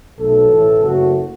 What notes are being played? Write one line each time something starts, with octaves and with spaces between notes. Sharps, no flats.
B1 B2 F#3 A3 A4
A1 A2 E3
F#1 F#2 F#3 A3 F#4